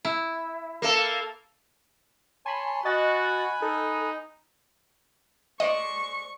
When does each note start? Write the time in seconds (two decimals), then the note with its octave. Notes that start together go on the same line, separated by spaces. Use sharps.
0.05 E4
0.82 A#3 A4
2.46 C#5 G#5 A5 B5 C6
2.85 F#4 D#5 G#5 B5 F#6 A6
3.62 D#4 A4
5.60 G#3 C5 D5 D#5 C#6